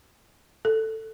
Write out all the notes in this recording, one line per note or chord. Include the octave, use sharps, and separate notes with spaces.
A4